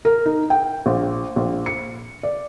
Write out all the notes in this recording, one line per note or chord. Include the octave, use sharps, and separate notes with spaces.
A#4
D#4
G5
A#1
A#1
C#7
D5